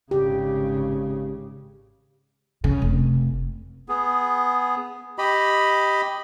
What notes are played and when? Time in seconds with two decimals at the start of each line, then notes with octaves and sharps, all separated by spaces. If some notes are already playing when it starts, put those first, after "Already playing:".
0.11 G#1 C#3 G4
2.64 C#3
2.82 F1
3.89 B3 G#4
5.18 G4 D#5 B5